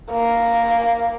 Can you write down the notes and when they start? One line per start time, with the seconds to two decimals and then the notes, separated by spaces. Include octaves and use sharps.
0.12 A#3